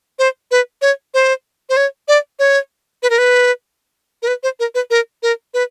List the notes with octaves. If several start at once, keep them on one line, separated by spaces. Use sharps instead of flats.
C5
B4
C#5
C5
C5
C#5
D5
C#5
B4
A#4
B4
A#4
B4
C5
A#4
B4
A#4
A#4
B4